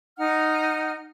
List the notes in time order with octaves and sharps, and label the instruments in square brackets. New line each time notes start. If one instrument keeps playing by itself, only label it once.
[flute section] D#4 F#5 F6